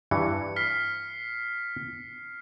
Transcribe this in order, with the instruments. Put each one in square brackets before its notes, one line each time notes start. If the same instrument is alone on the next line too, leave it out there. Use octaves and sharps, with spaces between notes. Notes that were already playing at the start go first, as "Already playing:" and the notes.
[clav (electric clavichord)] G2 E3 [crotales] C#7
[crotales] F6 B6 C7